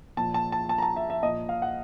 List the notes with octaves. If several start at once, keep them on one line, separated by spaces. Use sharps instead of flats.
A#2 F3 A5
A5
A5
A5
A#5
A5
E5
E5
A#2 F3 D#5
F5
F#5